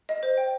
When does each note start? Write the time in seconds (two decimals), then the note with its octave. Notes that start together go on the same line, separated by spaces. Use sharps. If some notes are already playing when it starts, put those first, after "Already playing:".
0.09 D#5
0.23 C5
0.37 G5